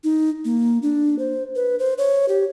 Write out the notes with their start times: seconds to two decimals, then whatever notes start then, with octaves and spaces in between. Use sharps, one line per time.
0.04 D#4
0.45 A#3
0.83 D4
1.19 C5
1.56 B4
1.79 C5
1.98 C#5
2.29 G4